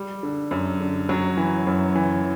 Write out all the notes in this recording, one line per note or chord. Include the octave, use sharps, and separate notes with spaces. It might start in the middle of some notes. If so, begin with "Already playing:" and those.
Already playing: G3
D3
F#2
D3
F#2 F#3
E3
F#2
E3